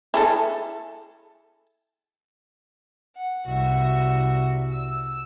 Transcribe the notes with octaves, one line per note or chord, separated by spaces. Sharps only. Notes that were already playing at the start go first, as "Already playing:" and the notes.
E4 G#4 A4
F#5
C2 F#4 E5
E6